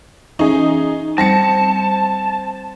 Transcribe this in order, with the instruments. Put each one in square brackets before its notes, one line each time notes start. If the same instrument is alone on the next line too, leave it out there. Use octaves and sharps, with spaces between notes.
[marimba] E3 C#4 [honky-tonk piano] D#4 G#4
[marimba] G3 [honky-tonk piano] C4 A#6 C#7 [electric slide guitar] A5